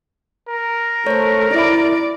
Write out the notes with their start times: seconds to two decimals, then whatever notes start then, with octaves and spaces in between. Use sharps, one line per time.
0.48 A#4
1.07 A3 C5 C#5
1.54 E4 D5 E5 B5